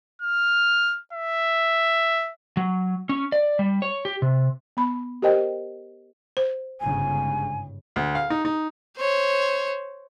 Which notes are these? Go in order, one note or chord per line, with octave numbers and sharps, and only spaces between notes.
F6
E5
F#3
C#4
D5
G3
C#5
G4
C3
B3 B5
G4 A#4 C5 D#5 G5
C5
G1 G#2 C#3 G#5
D2
F5
D#4
D#4
C5 C#5